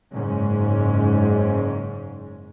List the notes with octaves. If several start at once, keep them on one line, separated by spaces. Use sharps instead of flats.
F#1 G#2 G#3 C#4